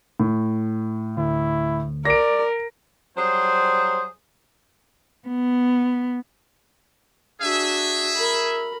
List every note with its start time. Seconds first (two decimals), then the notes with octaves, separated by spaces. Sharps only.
0.20 A2
1.17 D2 E4
2.05 A#4 D5 A#6 D7
3.16 F#3 G3 G#4 C5
5.28 B3
7.41 D4 F#4 G#4 E5
8.16 A#4 B5